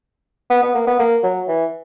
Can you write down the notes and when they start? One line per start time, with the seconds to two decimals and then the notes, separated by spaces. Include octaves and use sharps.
0.50 B3
0.62 B3
0.75 A#3
0.87 B3
0.99 A#3
1.23 F#3
1.48 E3